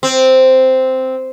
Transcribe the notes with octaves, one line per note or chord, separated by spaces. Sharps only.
C4